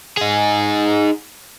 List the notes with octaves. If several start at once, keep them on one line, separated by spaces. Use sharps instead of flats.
D#4 G#4